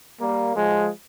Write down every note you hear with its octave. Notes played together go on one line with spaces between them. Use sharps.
G3 A#3
F3 G#3